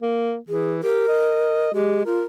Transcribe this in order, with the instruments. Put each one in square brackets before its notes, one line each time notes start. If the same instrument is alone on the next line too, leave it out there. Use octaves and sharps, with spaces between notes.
[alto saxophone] A#3
[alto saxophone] E3 [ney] G#4
[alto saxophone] G4 [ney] A#4
[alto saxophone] D#5
[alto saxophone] G#3 [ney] G4
[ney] F4 [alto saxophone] A#4